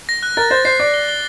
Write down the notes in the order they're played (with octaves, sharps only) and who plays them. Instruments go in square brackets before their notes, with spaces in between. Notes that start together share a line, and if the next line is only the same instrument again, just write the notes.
[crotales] A#6
F#6
[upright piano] A#4 [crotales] A6
[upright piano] C5 [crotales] A6
[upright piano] C5 [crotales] C7
[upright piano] D5 [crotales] A6
[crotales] G7
G7